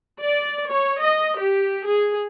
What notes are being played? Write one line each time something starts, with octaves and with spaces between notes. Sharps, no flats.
D5
C#5
D#5
G4
G#4